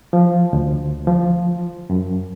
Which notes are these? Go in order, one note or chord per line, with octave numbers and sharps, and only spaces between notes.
F3
D2
F3
F#2